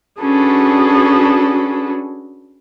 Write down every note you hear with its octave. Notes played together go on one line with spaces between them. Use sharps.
C#4 D4 F#4 G#4 A4 B4